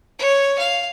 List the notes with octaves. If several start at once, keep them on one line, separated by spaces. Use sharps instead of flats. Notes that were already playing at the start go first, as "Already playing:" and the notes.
C#5
F5